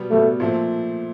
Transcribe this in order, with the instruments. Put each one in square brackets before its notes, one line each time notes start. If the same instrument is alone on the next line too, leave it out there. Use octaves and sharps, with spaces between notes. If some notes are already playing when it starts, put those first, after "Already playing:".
Already playing: [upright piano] B2 G3 B3
[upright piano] B2 G3 B3 [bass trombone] A3
[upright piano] A#2 F3 A3 C4